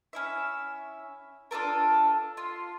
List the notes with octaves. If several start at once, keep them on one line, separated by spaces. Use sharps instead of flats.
C#4 E4 E5
D4 F4 A4 A#4
F4